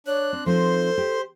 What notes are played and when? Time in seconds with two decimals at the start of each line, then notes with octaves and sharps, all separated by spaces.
0.07 D4 C#5 F#6
0.33 C4
0.46 F3 C4 D#4 A4 C5 C6
0.98 G4